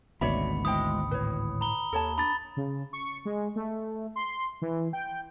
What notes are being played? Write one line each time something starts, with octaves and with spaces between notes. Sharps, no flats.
G#1 D2 B2 C#5 D5 E5 B5 C#7
G#3 E4 C5 G5 D#6
A2 B4 C#5
A#5 B5 G7
D#2 A4 C#5 A5
D4 B5 A6
C#3
C#6
G#3
A3
C6
E3
G5